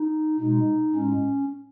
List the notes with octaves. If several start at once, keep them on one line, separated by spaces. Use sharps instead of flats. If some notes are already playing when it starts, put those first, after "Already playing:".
Already playing: D#4
B2 G#3 D#4
A2 G#3 C#4